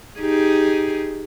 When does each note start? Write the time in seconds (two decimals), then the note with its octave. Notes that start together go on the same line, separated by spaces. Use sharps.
0.20 D#4 G4 G#4